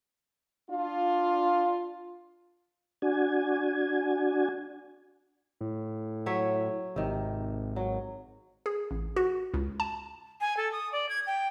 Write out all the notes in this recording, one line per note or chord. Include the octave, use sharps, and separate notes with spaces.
D4 F4
D4 F#4 G#5
A2
F#3 C#5 E5
G#1 C3 D#3
F#3
G#4
A1
F#4
C#2
A5
G#5
A4
D#6
D5
G#6
G5